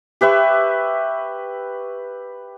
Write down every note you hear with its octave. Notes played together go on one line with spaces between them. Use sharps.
G4 B4 E5 C#6